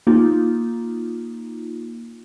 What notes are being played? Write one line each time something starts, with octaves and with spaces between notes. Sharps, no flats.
A#3 D#4 F4